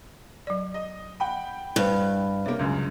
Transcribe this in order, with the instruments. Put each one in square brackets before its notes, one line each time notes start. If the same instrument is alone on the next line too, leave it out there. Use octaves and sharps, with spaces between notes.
[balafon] F#3 D5
[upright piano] D#5
F#5 G5 B5
[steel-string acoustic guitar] G2 [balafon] E4 B4 C5
[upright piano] C3 A#3 [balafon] C#5 F5
[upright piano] C#2 F#2 C#3